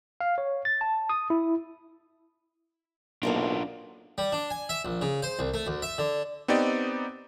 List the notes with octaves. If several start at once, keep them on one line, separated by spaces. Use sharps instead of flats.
F5
C#5
A6
A5
D#6
E4
B1 A#3 D4 F4 A#4 F#5
G3
D4
G#5
E5
A#1
C#3
C5
C2
A3
D2
E5
D3
B3 C4 D#4 G4 D5